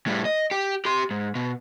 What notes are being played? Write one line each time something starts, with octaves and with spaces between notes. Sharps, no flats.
A2 G3
D#5
G4
G4 C6
G#2
B2